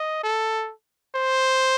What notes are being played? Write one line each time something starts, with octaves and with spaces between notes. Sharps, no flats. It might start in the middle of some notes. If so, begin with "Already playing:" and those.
Already playing: D#5
A4
C5